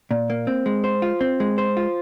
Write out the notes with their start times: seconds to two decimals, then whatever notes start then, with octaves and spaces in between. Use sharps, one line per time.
0.11 A#2
0.30 A#3
0.47 C4
0.66 G#3
0.84 C5
1.02 F4
1.21 C4
1.40 G#3
1.58 C5
1.77 F4